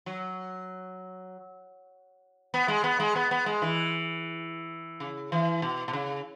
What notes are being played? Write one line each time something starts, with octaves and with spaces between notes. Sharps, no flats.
F#3
B3
G#3
B3
G#3
B3
B3
G#3
E3
C#3
E3
B2
B2
C#3